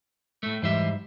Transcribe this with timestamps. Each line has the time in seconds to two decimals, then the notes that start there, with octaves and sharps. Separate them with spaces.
0.43 A2 A3
0.62 G#2 E3 G3 C5 E5